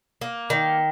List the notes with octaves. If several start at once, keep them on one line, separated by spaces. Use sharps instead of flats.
A#3
D#3